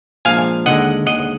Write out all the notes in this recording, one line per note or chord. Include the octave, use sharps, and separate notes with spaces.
A#2 F3 G#3 D4 F5 G#5
D#2 D3 G#3 D#5 F#5
D#2 D3 G#3 D#5 F#5